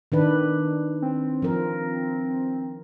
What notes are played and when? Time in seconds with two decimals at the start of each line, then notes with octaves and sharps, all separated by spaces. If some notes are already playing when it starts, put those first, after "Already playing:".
0.12 D#3 D4 B4
1.02 C4
1.42 F3 A#4